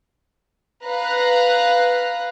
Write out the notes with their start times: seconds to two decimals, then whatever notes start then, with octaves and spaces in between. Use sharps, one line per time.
0.84 B4 F5 A#5 F#6